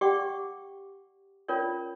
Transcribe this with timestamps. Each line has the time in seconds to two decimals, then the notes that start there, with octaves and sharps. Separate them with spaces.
0.01 G4 D5 F#5 G5 C#6 D6
1.48 C#4 F4 A#4 C#5 D5